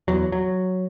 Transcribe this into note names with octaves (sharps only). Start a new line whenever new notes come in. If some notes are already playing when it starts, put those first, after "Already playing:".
E2 F#3
F#3